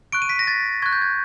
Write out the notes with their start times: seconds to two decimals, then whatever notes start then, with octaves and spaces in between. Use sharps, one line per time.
0.12 C#6 F#6 D7
0.22 D#7
0.29 B6
0.39 A#6
0.47 A6
0.82 C#6 F#6 G#6
0.93 G6
1.02 G#6